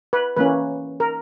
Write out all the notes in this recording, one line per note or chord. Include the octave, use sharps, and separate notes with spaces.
B4
E3 A#3 C#4 B4
A#4